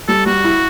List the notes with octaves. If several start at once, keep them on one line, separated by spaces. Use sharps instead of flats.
G3 A4
G3 F#4
E4